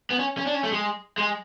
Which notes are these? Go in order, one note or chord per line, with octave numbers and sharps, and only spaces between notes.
B3
C#4
C#4
D4
C#4
A3
G#3
G#3